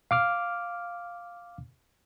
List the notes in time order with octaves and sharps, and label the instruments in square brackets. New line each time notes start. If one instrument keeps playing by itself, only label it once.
[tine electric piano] F5 D6 F6